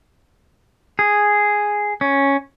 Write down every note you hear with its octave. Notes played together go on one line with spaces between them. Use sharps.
G#4
C#4